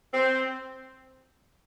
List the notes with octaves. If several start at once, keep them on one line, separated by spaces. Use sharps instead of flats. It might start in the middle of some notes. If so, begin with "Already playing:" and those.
C4